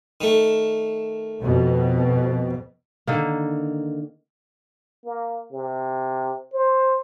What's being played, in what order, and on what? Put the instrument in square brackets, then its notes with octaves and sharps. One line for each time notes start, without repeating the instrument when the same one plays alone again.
[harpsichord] D#3 A3
[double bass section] F2 B2
[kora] D3 D#3 A#3
[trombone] A#3
C3
C5